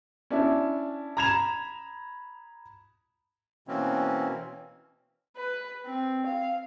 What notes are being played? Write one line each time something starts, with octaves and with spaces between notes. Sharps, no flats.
C#4 D4 E4
A#5 B5 G#6 E7 F7
B2 E3 A#3 C4 C#4
B4
C4
F5